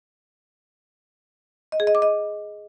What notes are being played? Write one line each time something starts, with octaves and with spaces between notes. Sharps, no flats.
D#5
G#4
D#5
D6
D#5